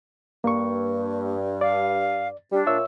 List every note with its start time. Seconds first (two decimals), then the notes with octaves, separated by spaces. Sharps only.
0.44 G2 A#3 C#6
1.61 D5 F5
2.52 G3 D4
2.67 A#2 C#5 E5 E6